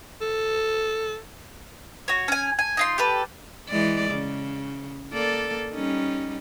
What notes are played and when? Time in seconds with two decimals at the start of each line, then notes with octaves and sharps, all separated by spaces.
0.21 A4
2.08 F#4 C#5
2.28 C#4 G#5
2.59 G#5
2.77 D#4 F4 C6
2.98 G4 A4 B4
3.69 E3 G#3 D5
4.10 C#3
5.12 A#3 A4 D5
5.72 G3 C#4 D#4